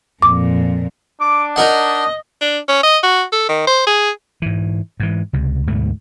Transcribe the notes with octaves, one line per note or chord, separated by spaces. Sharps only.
F2 A#2 D6
D4 D6
D#4 A#4 D#5 F#5
D4
C#4
D#5
F#4
A4
D#3
C5
G#4
G#2 E3
G#2 E3
C#2 C3
D2 G#2 B2 A3